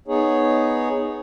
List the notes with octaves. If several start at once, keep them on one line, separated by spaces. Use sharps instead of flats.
B3 D#4 G#4 C#5